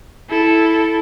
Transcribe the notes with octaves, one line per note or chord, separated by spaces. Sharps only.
E4 A4